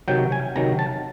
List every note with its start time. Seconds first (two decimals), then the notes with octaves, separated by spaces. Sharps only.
0.08 C3 D#3 F#3 G5
0.32 G#5
0.56 C3 D#3 F#3 A#5
0.79 A5